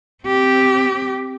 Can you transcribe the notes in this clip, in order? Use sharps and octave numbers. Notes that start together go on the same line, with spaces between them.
C4 G4